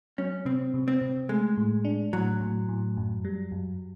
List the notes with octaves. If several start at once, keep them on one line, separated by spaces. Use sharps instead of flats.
F#3 C#4
C3 C4
C3
C4
C3
G#3 A3
A2
D4
A2 F#3
A2
A2
F#2
G3
F#2